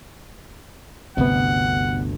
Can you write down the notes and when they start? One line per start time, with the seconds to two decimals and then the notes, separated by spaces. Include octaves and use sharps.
1.17 G1 D2 G2 C3 B3 F#5